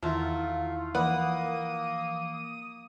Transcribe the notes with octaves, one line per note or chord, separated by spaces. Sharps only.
E2 D#3 F#3 A3 E4 F4
E3 F3 A#3 B4 D5 F#5 D#6